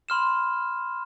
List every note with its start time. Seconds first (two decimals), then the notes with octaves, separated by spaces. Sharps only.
0.09 B5 C6 F6 E7